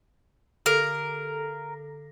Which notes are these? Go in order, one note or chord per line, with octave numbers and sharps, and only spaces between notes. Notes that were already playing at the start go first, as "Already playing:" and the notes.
D3 A4 A#4 A#6